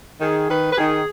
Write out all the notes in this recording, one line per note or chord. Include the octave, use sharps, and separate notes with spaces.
D#3 G#4
D#3 B4
B4
D#3 G#4